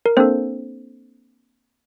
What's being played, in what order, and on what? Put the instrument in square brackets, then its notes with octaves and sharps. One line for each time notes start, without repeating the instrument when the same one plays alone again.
[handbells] A#4
A#3 C4 D4 A4 C5